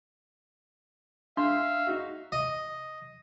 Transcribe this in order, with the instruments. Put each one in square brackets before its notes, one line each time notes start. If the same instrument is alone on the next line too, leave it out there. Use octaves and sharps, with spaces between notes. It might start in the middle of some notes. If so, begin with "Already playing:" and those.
[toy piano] D4 [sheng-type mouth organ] E5 F5 [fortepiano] C6
[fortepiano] D#4 F#4
[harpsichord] D#5